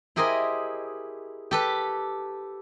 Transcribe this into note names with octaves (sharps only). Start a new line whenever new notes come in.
E4 G4 G#4 A#4 C5 D#5
G4 A4 B4